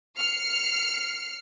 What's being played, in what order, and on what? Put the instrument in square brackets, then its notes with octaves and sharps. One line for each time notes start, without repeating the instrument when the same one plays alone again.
[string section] F6 C7 C#7